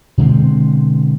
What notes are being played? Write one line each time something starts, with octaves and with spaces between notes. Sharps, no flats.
B2 D3 G#3 C4